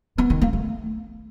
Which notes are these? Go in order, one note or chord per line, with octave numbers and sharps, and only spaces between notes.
B3
D#3
A#3
A3